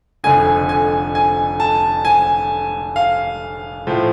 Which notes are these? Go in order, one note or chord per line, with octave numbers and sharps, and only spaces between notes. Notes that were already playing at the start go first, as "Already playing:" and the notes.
F1 F2 D3 G#5
G#5
G#5
A5
G#5
F5
A2 F3